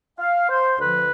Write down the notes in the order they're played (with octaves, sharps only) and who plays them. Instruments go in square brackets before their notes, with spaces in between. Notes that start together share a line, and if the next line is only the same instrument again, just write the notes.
[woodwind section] F5
C5
D2 D3 F3 B4